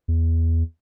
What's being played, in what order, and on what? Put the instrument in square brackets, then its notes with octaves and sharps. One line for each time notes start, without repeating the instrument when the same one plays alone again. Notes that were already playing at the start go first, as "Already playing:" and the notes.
[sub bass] E2